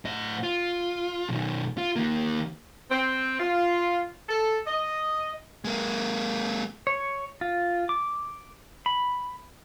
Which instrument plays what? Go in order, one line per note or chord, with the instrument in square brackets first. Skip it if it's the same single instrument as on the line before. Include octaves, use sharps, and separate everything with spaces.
[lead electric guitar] A2 D#5
F4
B1 D#3
F4
D#3 A#3
[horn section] C4
F4
A4
D#5
[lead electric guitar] G#3 A#3
[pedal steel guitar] C#5
F4
D6
B5